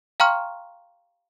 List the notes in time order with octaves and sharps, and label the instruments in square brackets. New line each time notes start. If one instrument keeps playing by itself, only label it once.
[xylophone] F5 G5 A#5 C6 C#6 F6